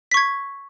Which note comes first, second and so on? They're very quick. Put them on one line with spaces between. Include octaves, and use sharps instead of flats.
B6 C#6 G#6